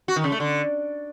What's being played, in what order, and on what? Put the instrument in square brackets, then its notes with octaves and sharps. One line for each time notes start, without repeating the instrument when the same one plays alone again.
[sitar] F#4
D#3
C#3
A3
D3